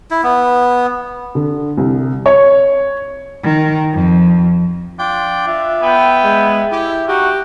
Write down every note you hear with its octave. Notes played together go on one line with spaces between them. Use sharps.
E4
B3
D3
C2
C#5
D#3
F2
D4 F4 G5
F4 E5
B3 G5
G#3
E4 G4
D#4 F#4 G4